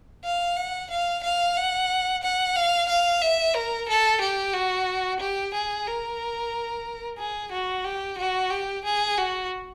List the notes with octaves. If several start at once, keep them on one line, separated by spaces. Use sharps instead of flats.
F5
F#5
F5
F5
F#5
F#5
F5
F5
E5
A#4
A4
G4
F#4
G4
G#4
A#4
G#4
F#4
G4
F#4
G4
G#4
F#4